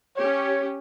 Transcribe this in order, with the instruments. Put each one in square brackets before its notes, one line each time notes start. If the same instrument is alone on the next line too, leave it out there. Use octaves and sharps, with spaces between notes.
[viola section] C#4 G4 [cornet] C#5